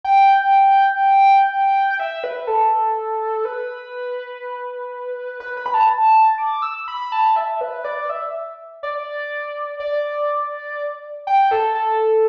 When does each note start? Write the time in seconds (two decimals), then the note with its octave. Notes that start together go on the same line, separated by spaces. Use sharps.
0.04 G5
1.90 G5
2.00 E5
2.24 B4
2.47 A4
3.45 B4
5.40 B4
5.57 B4
5.66 B5
5.74 A5
6.38 D6
6.62 E6
6.88 B5
7.12 A5
7.36 E5
7.61 B4
7.84 D5
8.09 E5
8.83 D5
9.80 D5
11.27 G5
11.51 A4
11.75 A4